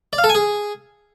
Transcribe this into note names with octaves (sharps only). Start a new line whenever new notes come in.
D5
F5
A4
G#5
G#4